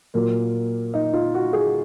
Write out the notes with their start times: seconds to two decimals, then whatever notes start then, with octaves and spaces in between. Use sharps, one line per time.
0.14 A#2 F#3 A#3
0.94 D#4
1.13 F4
1.34 F#4
1.53 G#4